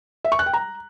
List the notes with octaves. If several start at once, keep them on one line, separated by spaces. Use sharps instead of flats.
E5
C#6
F#6
G5
A#5